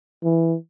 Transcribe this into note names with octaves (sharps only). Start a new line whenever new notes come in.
E3